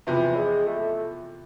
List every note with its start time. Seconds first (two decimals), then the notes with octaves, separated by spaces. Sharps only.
0.07 E2 C3 E3 F3
0.36 G#3
0.66 A3